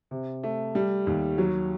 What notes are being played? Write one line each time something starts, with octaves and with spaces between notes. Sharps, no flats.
C3
A3
G3
D#2
F#3